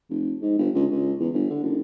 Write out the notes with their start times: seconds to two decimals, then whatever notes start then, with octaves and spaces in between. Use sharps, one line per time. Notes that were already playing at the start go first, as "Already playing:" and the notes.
0.09 F1
0.42 G#2
0.58 G1
0.75 C#2
0.91 C#2
1.20 E2
1.33 G1
1.50 D3
1.63 F#1